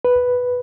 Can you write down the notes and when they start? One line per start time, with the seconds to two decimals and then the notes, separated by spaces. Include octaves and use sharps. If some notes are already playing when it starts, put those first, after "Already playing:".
0.05 B4